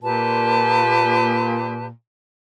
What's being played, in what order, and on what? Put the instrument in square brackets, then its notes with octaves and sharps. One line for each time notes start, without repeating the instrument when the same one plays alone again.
[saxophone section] A#2 [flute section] G4 B4 A5